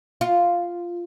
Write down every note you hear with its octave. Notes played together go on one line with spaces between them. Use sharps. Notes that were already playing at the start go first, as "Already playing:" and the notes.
F4